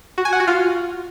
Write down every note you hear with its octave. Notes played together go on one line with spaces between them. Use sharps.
F#4
G#5
F#5
F#4
F4